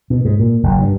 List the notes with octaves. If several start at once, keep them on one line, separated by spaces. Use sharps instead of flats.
B2
G#2
A#2
F#1
G2